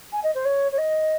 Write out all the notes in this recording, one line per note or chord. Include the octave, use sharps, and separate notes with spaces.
G#5
D#5
C5
C#5
C#5
D#5